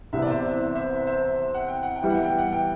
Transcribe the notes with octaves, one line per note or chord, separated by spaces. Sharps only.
C2 C3 E3 B3 E5
D5
C5 E5
C5 E5
C5 E5
F#5
G5
F#5
G5
E3 G3 B3 E4
F#5
G5
F#5
G5